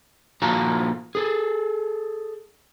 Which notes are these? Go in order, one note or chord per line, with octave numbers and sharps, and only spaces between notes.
A#2 F3 F#4 F5 A5 A#5
G#4 A4